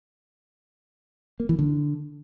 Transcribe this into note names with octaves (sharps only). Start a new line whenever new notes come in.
A#3
E3
D3